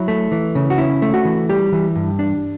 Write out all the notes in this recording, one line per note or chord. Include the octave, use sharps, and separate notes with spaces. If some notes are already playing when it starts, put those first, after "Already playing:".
Already playing: F#3 E4
A3
E3
C#3
F#4
C#4 E4
A3
F#4
E3
G3 G4
E3
G2
D4